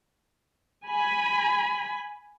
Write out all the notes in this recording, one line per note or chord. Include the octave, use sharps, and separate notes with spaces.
G#5 B5